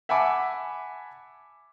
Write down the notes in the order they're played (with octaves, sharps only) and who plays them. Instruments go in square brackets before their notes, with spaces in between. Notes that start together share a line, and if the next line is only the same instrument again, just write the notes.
[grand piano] E5 F#5 G#5 A5 B5 D6